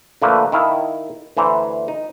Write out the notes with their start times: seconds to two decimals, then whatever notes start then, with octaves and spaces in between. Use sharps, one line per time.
0.22 D3 F3 A3 A#3 B4
0.52 D#3 E4 F5 A5
1.37 D2 E3 C5 A#5
1.88 D#4